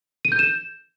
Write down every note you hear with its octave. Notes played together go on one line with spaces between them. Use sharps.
D#7
G6
E7